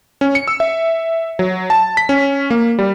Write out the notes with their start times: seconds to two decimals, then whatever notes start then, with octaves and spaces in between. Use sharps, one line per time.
0.21 C#4
0.35 C#7
0.48 E6
0.60 E5
1.39 F#3
1.70 A5
1.97 B6
2.09 C#4
2.50 A#3
2.79 G3